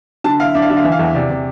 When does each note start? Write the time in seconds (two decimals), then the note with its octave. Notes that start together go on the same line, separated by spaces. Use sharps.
0.24 D3 A5
0.40 E4 F5
0.54 D4 E5
0.62 F5
0.70 D3 E5
0.77 F5
0.84 E3 E5
0.92 F5
0.99 E2 E5
1.15 C3 D5
1.30 C3